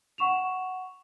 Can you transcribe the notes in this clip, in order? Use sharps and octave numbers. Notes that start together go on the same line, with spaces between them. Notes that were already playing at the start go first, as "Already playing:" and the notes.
F#5 C#6 E7 F7